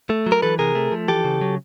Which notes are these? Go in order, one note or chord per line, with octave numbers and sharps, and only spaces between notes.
A3
F#3
A#4
E3 A4 B4
C3 G#4 A#4
A3
F3
E3 G4 A4
C#3
F#3